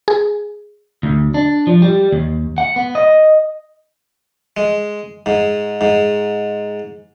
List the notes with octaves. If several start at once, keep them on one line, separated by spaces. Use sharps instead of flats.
G#4
D2
D4
F3
G3
D#2
F#5
B3
D#5
G#3
G#2
G#2